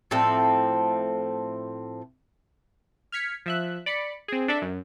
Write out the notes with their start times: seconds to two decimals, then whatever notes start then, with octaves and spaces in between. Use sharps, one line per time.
0.11 A2 F3 C4 A4
3.12 F6 G#6 B6 C#7
3.46 F3 E5 F#6
3.86 D5 B5 C#7
4.28 C4 G#4
4.48 D4 A4 D5 E5
4.62 F#2